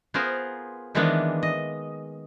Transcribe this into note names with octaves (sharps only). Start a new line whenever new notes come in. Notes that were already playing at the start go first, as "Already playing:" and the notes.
B3 F4 G#4 A#4 C5
D#3 E3 G#3 A#3 B3 D4
D#5